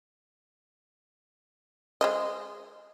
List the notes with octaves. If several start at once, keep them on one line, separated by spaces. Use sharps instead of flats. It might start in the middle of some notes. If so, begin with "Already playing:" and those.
G#3 C5 D#5